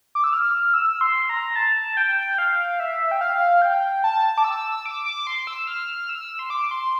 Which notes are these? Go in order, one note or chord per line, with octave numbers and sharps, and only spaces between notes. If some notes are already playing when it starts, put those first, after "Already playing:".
D6
E6
F6
E6
C6
A#5
A5
G5
F5
E5
G5
F5
G5
A5
D6
E6
D6
D6
C6
E6
F6
E6
C6
D6
C6